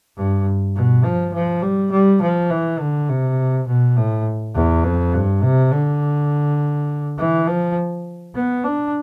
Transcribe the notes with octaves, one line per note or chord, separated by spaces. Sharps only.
G2
B2
F3
F3
G3
G3
F3
E3
D3
C3
B2
A2
E2
F2
G2
C3
D3
E3
F3
B3
D4